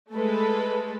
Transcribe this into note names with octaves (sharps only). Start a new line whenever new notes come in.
G#3 A3 A4 B4